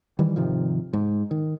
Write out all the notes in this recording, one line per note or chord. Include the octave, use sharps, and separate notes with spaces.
D#3 E3 G3
G#1 C3 D#3 F3
G#2
D#3